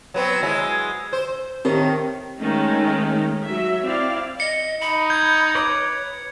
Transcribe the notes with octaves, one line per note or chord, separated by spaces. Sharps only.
F#3 B3 C4
F#3 G#3 E4 E6
C5
A2 D#3 C4 G4 A#4
D#3 G#3 A3 C#4 D#4
F#3 E5
C4 E4 D5 F5
D#5 C#7
D#4 B5
G6 G#6
B4 C#5 D6